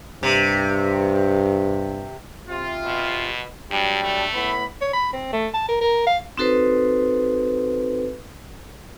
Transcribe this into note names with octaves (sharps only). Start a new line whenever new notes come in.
G2 C3
C3 F4
B2
G2 F#3 G3 D4
A3
A2 B3 B5
C#5
B5
C4
A3
A5
A#4
A#4
F5
C4 D#4 F#4 A4 B4 C5